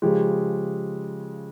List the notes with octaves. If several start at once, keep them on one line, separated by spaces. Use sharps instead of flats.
C#3 F3 G#3 G4